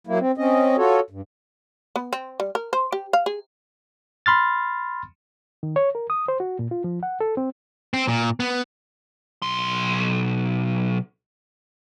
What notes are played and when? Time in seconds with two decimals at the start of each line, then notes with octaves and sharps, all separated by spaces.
0.07 F#3 A#3 E4
0.20 C4
0.38 C4 C#4 D#5
0.77 F4 F#4 A4 C#5
1.10 G2
1.96 B3
2.13 C4
2.40 G3
2.55 A#4
2.73 C5
2.92 G4
3.13 F5
3.26 G#4
4.26 B5 C6 F6 A6
5.63 D#3
5.76 C#5
5.95 A#4
6.10 D#6
6.28 C5
6.40 F#4
6.59 A#2
6.71 F4
6.84 F3
7.03 F#5
7.21 A4
7.37 C4
7.94 C4
8.08 A#2
8.40 B3
9.42 B1 C6